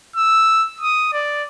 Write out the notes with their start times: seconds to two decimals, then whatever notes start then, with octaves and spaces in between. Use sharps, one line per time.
0.16 E6
0.81 D#6
1.13 D5